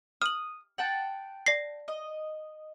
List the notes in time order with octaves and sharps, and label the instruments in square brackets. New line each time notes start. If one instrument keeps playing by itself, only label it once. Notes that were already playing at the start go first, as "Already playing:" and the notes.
[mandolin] D#6 [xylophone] F6 F#7
[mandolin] F#5 G5 A5
[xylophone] D5 A#6 C7
[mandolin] D#5